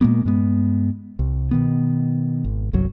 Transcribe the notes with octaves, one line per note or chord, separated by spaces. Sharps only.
A#2 G#3 A#3 B3
G2 G#3 B3
C2
B2 D#3 B3
G#1
G1 C2 F#3